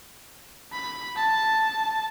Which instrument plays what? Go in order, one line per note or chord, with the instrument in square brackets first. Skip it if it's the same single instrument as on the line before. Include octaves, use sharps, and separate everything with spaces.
[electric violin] B5
A5